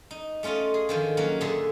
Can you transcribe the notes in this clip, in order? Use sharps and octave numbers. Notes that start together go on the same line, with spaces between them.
D#4
A3 C#4 F4 D5 D#5
G#4
D3 D#3 F3
F#3 A#3 C#4
A#2 D3 G#4 A4 E5